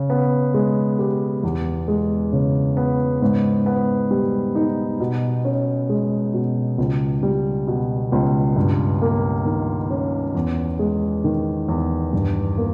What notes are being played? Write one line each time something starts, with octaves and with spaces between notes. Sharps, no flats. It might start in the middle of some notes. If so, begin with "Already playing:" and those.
Already playing: C#3
B3
G#3
G4
E2
G#3
C#3
B3
G#2
B3
G3
D#4
B2
C#4
G#3
B2
C#2
G3
B2
C#2
G2
A#3
D#3
C#4
E2
G#3
D#3
E2
G2
A#3